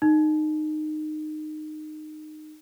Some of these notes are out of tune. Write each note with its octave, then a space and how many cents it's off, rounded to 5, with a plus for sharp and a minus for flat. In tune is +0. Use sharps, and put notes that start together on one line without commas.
D#4 -20